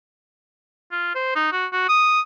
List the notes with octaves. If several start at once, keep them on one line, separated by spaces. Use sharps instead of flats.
F4
C5
D#4
F#4
F#4
D#6